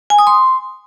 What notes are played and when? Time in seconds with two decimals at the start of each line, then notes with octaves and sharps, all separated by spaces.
0.10 G#5
0.19 D#6
0.27 C6